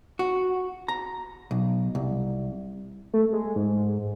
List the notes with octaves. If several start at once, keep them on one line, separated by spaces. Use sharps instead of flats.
F#4
A#5
B1
C2
A3
G#3
G#2